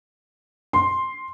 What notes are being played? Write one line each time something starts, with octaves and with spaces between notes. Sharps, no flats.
C6